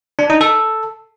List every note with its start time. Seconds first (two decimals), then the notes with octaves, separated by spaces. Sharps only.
0.19 D4
0.30 D#4
0.41 A4